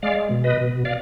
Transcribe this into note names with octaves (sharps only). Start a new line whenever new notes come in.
G#3 D5 F5
B2
B4 D#5
B2
D5 F5